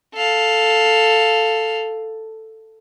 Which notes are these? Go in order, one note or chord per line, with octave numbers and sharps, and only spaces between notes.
A4 F5